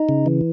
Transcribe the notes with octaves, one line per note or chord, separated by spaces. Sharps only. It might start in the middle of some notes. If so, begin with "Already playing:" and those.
Already playing: D#4
C#3
E3